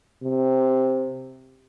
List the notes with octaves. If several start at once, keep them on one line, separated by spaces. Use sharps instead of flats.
C3